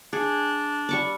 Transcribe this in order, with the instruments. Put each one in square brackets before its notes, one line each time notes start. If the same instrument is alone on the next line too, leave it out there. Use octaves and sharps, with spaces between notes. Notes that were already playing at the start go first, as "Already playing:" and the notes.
[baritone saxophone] D4 [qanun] G#4
[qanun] G3 C#6 D6